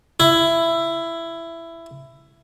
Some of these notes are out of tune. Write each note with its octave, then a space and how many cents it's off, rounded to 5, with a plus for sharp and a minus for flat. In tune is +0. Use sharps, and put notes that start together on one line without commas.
E4 +15